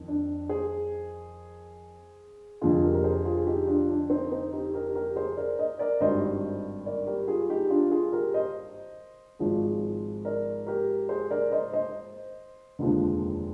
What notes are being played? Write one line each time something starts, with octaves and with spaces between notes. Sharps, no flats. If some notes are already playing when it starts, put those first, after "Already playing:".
Already playing: F2 D#3
D4
G#4 C5
F1 F2 D3 F4 G#4
G4 A#4
A#4
G#4 C5
F4 G#4
D#4 G4
D4 F4
D4
C4 D#4
C4 D#4
D#4 G4
G4 A#4
G4 A#4
G#4 C5
A#4 D5
C5 D#5
A#4 D5
G#1 G2 D#3 C5 D#5
A#4 D5
G4 A#4
F4 G#4
D#4 G4
D4 F4
F4 G#4
G4 A#4
C5 D#5
G#1 G#2 F3 G#3
A#4 D5
G4 A#4
G#4 C5
A#4 D5
C5 D#5
C5 D#5
F1 D#2 D3 F3 G#3